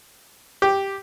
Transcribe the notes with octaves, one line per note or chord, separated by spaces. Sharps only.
G4